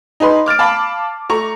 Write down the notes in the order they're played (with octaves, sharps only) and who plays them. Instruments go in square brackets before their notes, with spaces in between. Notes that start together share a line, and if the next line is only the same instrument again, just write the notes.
[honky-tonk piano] D#4 G#4 B4 C6
D6 F6 A6 D7
F5 A5 B5 D6
A3 A#5 C#6